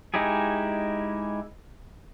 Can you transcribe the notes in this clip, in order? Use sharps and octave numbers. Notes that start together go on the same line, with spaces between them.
G#3 D#4 E4 G4 G#4